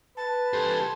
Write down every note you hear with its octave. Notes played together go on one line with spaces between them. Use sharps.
B4 A5
C#2 G4 A4 C5 G#5